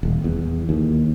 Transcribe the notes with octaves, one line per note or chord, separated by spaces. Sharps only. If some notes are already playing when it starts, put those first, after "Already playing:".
D#1
E2
D#2